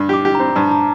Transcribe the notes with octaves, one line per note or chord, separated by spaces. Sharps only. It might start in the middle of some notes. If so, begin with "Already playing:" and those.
Already playing: G2
G4 D6
G4
C4 A#5
G2 A5
A5
A#5